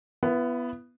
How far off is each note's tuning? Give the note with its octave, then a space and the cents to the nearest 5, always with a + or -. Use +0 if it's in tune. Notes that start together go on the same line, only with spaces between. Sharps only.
B3 +0 E4 +35